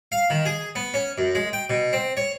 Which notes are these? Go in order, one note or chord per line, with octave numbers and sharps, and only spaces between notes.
F5
D#3
G#4
B3
C#4
F#2
G#3
G5
B2
C4
C#5